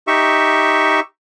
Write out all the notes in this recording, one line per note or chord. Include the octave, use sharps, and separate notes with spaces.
D#4 G4 E5 C#6